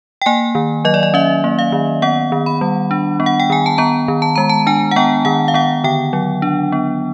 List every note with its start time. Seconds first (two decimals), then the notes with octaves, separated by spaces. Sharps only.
0.22 G5
0.26 A#3 G#5
0.55 D#3
0.85 F#3 D#5
0.94 D5
1.03 D#5
1.14 C#4 E5
1.44 A#3
1.59 F5
1.72 D#3
2.02 B3 F#5
2.32 D#3
2.46 B5
2.61 G3
2.91 D4
3.20 B3
3.26 F#5
3.40 G5
3.50 D#3 G#5
3.66 A5
3.78 B3 A#5
4.08 D#3
4.22 A5
4.36 G#3 A#5
4.49 A5
4.67 D4 G#5
4.91 F#5
4.96 B3 G5
5.25 D#3 F#5
5.48 F5
5.54 B3 F#5
5.84 D3 G5
6.13 F#3
6.42 D4
6.72 B3